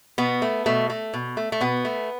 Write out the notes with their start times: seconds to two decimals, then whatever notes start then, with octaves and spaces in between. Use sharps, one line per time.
0.18 B2 B3
0.42 A3
0.66 B2 A3
0.90 A3
1.14 B2
1.37 A3
1.52 A3
1.61 B2 B3
1.85 A3